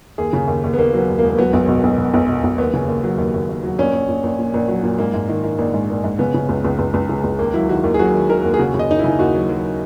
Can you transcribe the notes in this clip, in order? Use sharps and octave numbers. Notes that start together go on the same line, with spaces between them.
D#2 G#4
C#3
D#2
D#2
B3
D#2 A#3
F#3
B3
D#2
A#3
E1
A#3
F#3 B3
B1
B2
B1
B2
B1
B2
B1
D#2 B3
C#3
D#2
F#3
D#2
D#2
D#2
F#3
A#1 C#4
A#1
A#1
A#1
A#2
A#1
F#3
A#2
G#2 A#3
G#2
D#3
D#3
A#1
G#2
A#1
G#2
C#3 B3
C#3
C#2
C#2
C#2
C#2
C#3
C#2
D#2 A#3
F#3 E4
D#3 F#4
D#2
G#4
F#3 F#4
D#3
D#3 A#4
D#2
G#4
C#3 F#4
C#3
D#5
D#2 D#4
E4
C#3
D#2 F#4
F#3
F#3